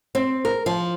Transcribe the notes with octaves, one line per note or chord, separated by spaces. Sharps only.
C4
A#4
F3